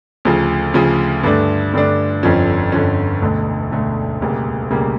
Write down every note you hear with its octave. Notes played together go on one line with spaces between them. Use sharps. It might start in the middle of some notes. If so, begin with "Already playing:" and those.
D2 C#3 F3
D2 C#3 F3
G2 D3 A3 D4
G2 D3 A3 D4
G1 F2 D3 F3 C#4
G1 F2 D3 F3 C#4
E1 D2 D3 A3
E1 D2 D3 A3
E1 D2 C#3 G3 A#3
E1 D2 C#3 G3 A#3